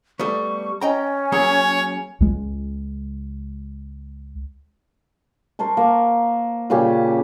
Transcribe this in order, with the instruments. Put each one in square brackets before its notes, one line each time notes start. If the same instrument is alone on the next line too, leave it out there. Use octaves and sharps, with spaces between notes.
[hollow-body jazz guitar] G3 A3 B3 [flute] C#6
[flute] C#4 [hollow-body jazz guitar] D#5 G5 A#5
[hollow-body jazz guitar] F#3 A#3 G#4 [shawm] C#5
[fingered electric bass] C#2 G#3
[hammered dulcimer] A#4 C5 A5 C#6
A#3
A#2 C#3 C#4 G4